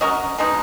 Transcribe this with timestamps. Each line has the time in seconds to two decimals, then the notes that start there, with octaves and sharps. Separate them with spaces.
0.01 C#4 F#4 A#4 D#5
0.38 B2 G#3 D#4